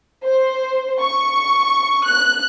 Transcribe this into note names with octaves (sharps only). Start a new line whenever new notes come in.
C5
C#6
F#6